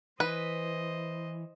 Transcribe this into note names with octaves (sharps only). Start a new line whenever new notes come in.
E3 B4 C5 D#5